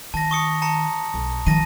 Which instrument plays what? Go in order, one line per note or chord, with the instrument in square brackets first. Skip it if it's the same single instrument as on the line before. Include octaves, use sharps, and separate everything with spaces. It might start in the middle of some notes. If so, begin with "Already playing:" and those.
[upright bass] D#3 [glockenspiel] A5 A#6
[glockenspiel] C#6 D#6 C#7
A5 A#5 C#7
[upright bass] B1
[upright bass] D#3 F3 [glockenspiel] A5 A#6 D#7